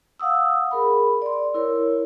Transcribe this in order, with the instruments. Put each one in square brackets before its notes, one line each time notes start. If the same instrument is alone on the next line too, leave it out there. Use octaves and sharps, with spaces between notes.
[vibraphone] F5 F#5 D#6 E6
G#4 A#4 B5
D5 C6
E4 A#4 C#5